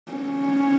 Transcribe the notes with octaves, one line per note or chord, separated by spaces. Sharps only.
C#4